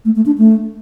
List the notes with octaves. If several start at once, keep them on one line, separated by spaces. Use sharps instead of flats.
A3
A3
D4
A3